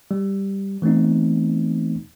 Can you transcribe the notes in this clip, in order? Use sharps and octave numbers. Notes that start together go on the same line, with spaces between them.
G3
E3 A3 B3 C4 D#4